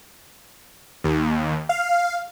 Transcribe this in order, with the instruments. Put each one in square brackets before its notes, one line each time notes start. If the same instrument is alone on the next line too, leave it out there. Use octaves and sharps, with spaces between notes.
[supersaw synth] D#2
F5